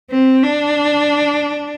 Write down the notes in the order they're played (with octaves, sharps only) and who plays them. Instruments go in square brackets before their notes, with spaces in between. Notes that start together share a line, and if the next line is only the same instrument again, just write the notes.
[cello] C4
D4